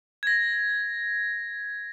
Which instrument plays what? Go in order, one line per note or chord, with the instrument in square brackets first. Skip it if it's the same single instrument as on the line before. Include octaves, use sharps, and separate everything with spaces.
[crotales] G#6 A#6